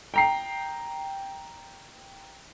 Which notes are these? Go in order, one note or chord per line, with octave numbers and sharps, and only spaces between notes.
G5 A#5 C7